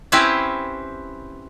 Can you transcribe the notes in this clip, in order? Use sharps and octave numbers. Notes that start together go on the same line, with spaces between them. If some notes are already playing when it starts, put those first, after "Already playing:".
C4 C#4 E4 G4 B4 C5